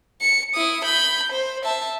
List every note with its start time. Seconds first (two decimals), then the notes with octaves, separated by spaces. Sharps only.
0.21 C#7
0.55 E4 D#6
0.85 B5 G6
1.33 C5
1.64 E5 A5